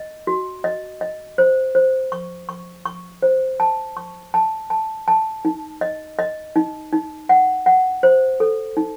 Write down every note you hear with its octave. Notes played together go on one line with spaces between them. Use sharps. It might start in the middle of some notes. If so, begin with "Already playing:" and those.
Already playing: D#5
F#4
D#5
D#5
C5
C5
C#6
C#6
C#6
C5
A5
C#6
A5
A5
A5
D#4
D#5
D#5
D#4
D#4
F#5
F#5
C5
A4
D#4